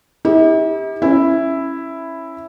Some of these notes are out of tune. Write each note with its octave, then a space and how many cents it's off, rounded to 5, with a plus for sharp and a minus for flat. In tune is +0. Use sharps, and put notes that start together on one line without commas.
E4 -45 G4 +25
C#4 -15 E4 +0